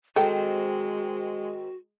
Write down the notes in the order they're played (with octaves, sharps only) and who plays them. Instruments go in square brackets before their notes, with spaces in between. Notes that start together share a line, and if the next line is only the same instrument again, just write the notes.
[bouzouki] D#3 C4 [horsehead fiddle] G#3 [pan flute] F#4 [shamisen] A4 G5